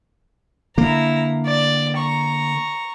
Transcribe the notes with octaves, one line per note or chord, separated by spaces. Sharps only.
D3 A#3 E4 A#5
D5
A#5 C#6